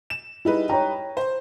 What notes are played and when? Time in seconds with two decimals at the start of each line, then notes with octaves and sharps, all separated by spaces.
0.10 E7
0.45 G3 D#4 E4 G#4 B4
0.69 C#5 G5 A#5
1.17 C5